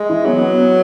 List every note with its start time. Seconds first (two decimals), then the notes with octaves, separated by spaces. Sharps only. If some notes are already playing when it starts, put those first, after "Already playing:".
Already playing: G#3
0.09 E3
0.25 F#3 B3
0.42 B3
0.58 B3